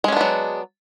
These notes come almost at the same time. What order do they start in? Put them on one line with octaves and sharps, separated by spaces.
G#3 C#4 D4 B3 F#3